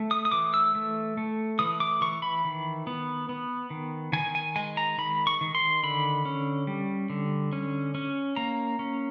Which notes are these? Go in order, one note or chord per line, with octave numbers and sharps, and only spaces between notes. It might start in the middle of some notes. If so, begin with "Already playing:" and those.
Already playing: A3
D#6
D#6
E3 D6
E6
A3
A3
E3 D#6
D6
E3 C#6
B5
D#3
B3
B3
D#3
D#3 G#5
G#5
G#3 G#5
A#5
D#3 B5
C#6
D#3
C6
D3 B5
C#4
G3
D3
C#4
C#4
A#3 A#5
C#4